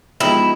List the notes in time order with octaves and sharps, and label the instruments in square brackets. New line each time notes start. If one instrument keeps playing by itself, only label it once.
[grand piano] F3 G#3 B3 D#4 G4 [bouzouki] E4